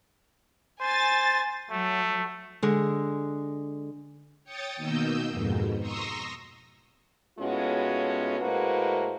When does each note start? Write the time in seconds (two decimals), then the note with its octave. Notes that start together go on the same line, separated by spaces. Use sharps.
0.80 C5 G#5 A6
1.70 F#3 A3
2.63 D3 G#3
4.44 C#5 G5 C#6 D#6 A6
4.76 B2 D#3 A#3 D#5 E6 G6
5.30 F2 G#2 B2
5.78 A#5 C6 C#6 D#6 E6 A#6
7.39 A2 G#3 B3 C#4 F4 F#4
8.41 A2 G#3 A#3 F#4 B4 C5